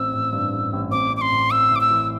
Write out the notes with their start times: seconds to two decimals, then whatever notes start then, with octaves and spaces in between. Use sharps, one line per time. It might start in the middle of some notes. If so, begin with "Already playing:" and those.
Already playing: A1 C4 E6
0.13 A1
0.33 G2
0.52 A1
0.73 A1
0.91 C4 D6
1.11 C4
1.17 D6
1.21 C6
1.32 A2
1.51 C4 E6
1.71 A2 D6
1.81 E6
1.91 E3